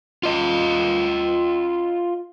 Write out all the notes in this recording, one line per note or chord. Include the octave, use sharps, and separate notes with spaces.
F4 D#5